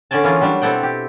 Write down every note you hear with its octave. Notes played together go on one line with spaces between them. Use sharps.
D3 C#4 D5 G#5 A5
E3 A#3 C#4 F4 G#4 A#4
F#3 G3 D4
B2 C4 E4 A4 F#5 G5
G4